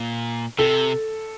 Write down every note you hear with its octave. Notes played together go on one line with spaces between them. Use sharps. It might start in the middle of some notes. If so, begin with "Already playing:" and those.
Already playing: A#2
C3 A4